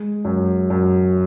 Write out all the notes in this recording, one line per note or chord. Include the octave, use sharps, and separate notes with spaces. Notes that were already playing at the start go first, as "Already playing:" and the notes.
Already playing: G#3
F#2
F#2